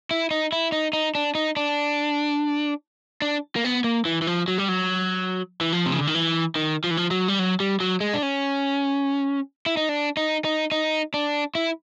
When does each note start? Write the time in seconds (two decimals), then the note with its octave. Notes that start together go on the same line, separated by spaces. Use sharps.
0.11 E4
0.31 D#4
0.52 E4
0.72 D#4
0.93 D#4
1.15 D4
1.35 D#4
1.56 D4
3.22 D4
3.56 A#3
3.65 B3
3.84 A#3
4.05 E3
4.22 E3
4.27 F3
4.48 F#3
4.58 G3
4.69 F#3
5.61 E3
5.72 F3
5.86 C3
5.92 C#3
5.99 D3
6.07 D#3
6.14 E3
6.56 D#3
6.84 F3
6.91 E3
6.97 F3
7.11 F#3
7.28 G3
7.39 F#3
7.60 G3
7.80 F#3
8.01 G#3
8.14 D4
8.23 C#4
9.66 E4
9.77 D#4
9.89 D4
10.17 D#4
10.45 D#4
10.72 D#4
11.14 D4
11.55 E4